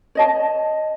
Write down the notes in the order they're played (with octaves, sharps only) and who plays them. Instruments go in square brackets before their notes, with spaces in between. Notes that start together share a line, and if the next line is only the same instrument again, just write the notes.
[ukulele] C#5 D#5 A5